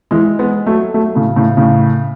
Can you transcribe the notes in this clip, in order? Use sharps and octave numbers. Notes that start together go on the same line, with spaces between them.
E3 G#3
G#3 B3
F#3 A3
F#3 A3
A2 C#3
A2 C#3
A2 C#3